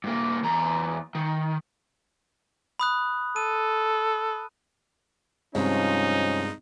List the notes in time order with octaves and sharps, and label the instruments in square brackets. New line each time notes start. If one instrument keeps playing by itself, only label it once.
[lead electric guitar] G2 A#3
E2 A#5
D#3
[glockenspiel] B5 D#6 F#6
[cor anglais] A4 [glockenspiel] D#7
[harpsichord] C2 [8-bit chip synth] G2 G#3 [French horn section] F3 C#4 [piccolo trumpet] D#4